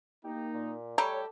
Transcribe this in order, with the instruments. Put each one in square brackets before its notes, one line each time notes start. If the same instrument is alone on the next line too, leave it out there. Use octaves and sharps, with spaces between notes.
[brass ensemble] A#3 D#4 [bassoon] G4
[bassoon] A#2
[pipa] G3 A3 G4 [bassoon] A4 [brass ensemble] C#5 [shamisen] A#5